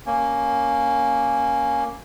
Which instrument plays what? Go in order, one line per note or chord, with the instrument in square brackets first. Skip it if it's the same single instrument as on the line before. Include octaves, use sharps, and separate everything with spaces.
[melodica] A#3 C#4